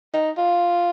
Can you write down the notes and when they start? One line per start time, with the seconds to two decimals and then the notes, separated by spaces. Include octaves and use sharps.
0.14 D#4
0.38 F4